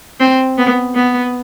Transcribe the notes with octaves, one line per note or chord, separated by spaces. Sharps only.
C4
B3
B3